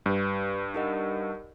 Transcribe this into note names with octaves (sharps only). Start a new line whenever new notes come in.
G2 D4 G4 B4
D#4 G4 A#4 D#5 F#5